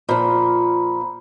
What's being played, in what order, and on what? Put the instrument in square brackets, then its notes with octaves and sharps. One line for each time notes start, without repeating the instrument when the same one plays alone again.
[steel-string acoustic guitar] A#2 F3 [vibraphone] A#5 B5